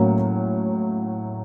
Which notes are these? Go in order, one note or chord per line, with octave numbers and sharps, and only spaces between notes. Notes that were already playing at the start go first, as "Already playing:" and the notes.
Already playing: A2 F#3 A#3 C#4